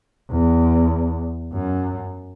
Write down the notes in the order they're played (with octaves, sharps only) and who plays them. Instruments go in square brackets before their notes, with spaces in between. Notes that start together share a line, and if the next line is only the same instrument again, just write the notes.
[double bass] E2
F#2